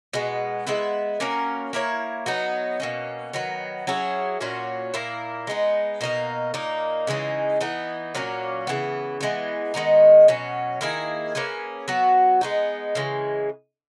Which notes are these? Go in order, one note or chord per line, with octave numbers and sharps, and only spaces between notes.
B2 G#3 B3
G#3 B3 E4 B4
A#3 C#4 F#4 A#4
A#3 E4 A#4 C#5
F#3 B3 D#4
B2 A#3 C#4
D#3 F#3 B3
F#3 C#4 E4 G#4
A#2 F#3 C#4 F#4
A#2 A#3 E4 A#4
G#3 B3 D#4
B2 A#3 D#4 A#4
A#2 A#3 D#4
C#3 E3 G#3 D#4
E3 B3 D#4
A#2 F#3 A#3 C#4
C#3 E3 B3
E3 G#3 B3
D#3 G#3 B3 D#4
B2 F#3 C#4
D#3 A#3 E4 G#4
A#3 C#4 G#4 B4
F#3 B3 F#4
G#3 B3 D#4
C#3 E3 G#3